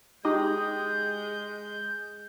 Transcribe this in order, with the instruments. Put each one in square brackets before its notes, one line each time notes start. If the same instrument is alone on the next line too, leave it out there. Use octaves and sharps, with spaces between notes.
[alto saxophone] G#3 [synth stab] D#4 G4 D#5 [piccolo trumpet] G6